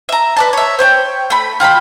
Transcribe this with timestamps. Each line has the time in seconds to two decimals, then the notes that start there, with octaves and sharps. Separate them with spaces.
0.09 E5 A#5
0.37 B4 D5 A5
0.53 C#5 E5
0.79 C5 C#5 G5
1.30 A3 B5
1.60 F4 G5 A#5 B5